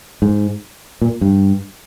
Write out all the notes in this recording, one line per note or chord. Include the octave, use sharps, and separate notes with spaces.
G#2
A#2
G2